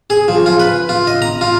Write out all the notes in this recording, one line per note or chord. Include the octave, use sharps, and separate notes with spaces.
G#4
F3
F4
B4
F4
D#5
A#5
F4